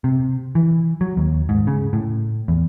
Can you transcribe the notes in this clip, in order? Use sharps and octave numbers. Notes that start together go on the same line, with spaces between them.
C3
E3
F#3
D#2
G#2
C#3
A2
E2